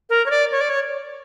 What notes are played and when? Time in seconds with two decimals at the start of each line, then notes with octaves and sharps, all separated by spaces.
0.10 A#4
0.26 C#5
0.30 D5
0.52 C#5
0.61 D5
0.70 C#5